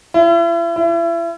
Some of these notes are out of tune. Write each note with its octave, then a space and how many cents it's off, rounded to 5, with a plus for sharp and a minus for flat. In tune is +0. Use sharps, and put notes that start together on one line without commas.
E4 +40
E4 +35